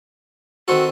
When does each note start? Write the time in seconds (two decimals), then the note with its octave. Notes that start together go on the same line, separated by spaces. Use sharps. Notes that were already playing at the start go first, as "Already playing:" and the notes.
0.68 D#3 C4 F#4 A4